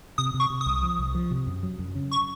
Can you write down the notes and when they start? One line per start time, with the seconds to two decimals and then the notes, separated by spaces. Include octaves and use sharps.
0.18 C3 D#6
0.34 C3
0.40 C#6
0.50 C3
0.61 D#6
0.66 C2
0.83 F3
0.99 C2
1.15 F3
1.31 C3
1.47 F#2
1.63 F#3
1.79 F#2
1.95 C#3
2.11 C#6